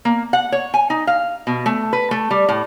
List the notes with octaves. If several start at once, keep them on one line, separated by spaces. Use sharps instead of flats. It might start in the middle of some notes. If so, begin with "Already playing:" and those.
A#3
F#5
C#5
G#5
D#4
F5
B2
A3
B4
A3
G3
A2